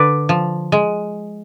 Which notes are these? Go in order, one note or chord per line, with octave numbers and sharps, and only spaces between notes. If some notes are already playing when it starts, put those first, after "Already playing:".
Already playing: D3 B4 D5
F3
G#3